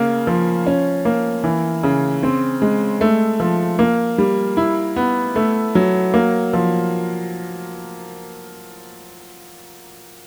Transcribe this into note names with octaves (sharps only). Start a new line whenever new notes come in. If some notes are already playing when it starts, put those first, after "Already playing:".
Already playing: C#3 A#3
F3
C#4
A#3
E3
C#3
C4
G#3
A3
F3
A#3
G3
E4
B3
A3
F#3
A#3
F3